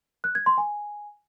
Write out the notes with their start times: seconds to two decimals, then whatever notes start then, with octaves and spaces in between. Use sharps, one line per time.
0.24 F#6
0.35 G#6
0.46 C6
0.58 G#5